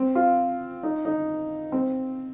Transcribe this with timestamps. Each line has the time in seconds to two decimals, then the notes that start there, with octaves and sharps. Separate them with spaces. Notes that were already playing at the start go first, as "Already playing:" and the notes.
Already playing: C4
0.15 F4
0.83 D#4
1.05 D#4
1.72 C4